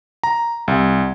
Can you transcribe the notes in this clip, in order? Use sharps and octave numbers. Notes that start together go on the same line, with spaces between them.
A#5
C2